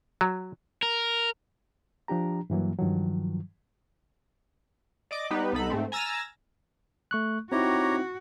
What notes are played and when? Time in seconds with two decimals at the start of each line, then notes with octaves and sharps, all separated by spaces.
0.21 F#3
0.83 A#4
2.08 F3 D4 G4 A#5
2.50 G2 E3 F#3 A#3
2.79 G2 D#3 F3 F#3
5.11 D5 D#5 D6
5.30 G3 B3 D#4 G4 B4
5.53 C2 B3 D#4 A4 B5
5.70 G#2 A3 C4
5.92 G#5 A#5 E6 F6 A6 A#6
7.11 A3 C#6 F#6
7.52 C4 D#4 E4 F#4 G4 C#5 A#5